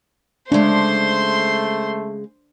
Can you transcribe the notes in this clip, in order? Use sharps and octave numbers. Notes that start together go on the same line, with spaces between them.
C#3 G#3 A3 D4 C5 C6